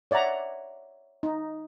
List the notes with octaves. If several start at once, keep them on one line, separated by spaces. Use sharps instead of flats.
C#5 D5 E5 F#5 A#5
D#4